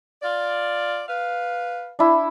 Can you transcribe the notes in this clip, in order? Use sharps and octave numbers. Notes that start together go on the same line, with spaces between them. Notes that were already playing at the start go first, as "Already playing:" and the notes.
F4 D5
B4 F5
D4 E4